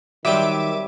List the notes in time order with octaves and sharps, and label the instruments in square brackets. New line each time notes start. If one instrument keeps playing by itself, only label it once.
[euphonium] D#3 [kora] F#3 G3 C4 [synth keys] E5 D6 D#7